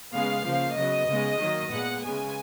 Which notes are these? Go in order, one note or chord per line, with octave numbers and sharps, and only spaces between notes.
C#3 G#3 B3 F5
C#3 F3 A#3
C#3 F#3 B3 D#5
C#3 G#3 B3
D#3 F#3 A#3
A#2 G#3 B3 F#5
C#3 G#3 B3 G#5